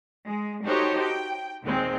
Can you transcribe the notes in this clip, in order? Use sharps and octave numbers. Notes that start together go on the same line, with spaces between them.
G#3
D#4 F#4 G4 A4 C5 C#5
G5
D#2 A#2 D#3 G#3 C4